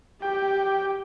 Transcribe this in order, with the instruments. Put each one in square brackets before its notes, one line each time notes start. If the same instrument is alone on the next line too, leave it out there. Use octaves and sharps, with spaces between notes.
[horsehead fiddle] G4 [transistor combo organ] G5